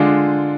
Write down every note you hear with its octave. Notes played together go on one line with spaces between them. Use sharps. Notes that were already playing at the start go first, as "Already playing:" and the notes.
Already playing: D3 G#3 D4 F4